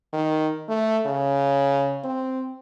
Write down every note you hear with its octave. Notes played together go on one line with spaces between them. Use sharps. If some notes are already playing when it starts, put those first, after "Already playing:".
D#3
A3
C#3
C4